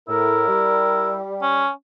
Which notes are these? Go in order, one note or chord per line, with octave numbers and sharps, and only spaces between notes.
A2 E4 A#4
G3
C#4